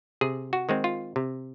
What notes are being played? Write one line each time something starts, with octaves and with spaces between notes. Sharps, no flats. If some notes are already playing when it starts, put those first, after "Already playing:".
C3 G#4
F#4
D#3 G#3 C4
F4
C3